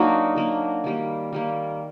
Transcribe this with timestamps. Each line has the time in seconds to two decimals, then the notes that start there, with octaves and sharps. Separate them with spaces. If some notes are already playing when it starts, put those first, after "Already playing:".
Already playing: F#3 A#3 D4 D#4 F#4
0.36 F#3 A#3 D4
0.84 D#3 G3 A#3
1.33 D#3 G3 A#3